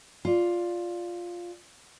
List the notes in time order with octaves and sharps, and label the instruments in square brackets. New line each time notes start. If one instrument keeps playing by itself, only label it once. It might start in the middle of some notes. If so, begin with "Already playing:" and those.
[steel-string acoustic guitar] F4 D5